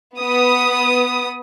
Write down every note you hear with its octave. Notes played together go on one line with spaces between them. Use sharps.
B3 D#6